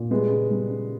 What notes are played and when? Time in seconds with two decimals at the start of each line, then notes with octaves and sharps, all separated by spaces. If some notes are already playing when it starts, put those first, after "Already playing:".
Already playing: A#2
0.11 G3 G#3 B3
0.30 C#3
0.51 G3
0.70 C#3